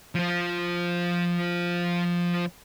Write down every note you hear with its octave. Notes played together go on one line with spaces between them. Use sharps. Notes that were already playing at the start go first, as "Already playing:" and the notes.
F3 F4